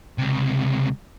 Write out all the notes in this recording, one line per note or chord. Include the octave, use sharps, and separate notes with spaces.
C#2 C3